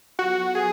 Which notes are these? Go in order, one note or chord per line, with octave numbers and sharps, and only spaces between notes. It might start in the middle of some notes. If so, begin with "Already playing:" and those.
F#3 B3 F4 F#4 A4
G#4